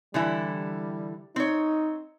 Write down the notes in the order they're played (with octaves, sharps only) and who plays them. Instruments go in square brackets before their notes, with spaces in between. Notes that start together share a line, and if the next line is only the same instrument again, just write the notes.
[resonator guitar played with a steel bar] D3 E3 E4 [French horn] G3
[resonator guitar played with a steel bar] C4 C#5 [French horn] D#4